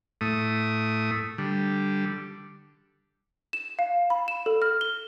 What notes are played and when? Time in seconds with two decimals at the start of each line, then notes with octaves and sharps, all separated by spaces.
0.21 A2 A3 D#6
1.38 D3 G3
3.53 E7
3.79 F5
4.10 B5
4.28 E7
4.46 A4
4.62 F6
4.81 G7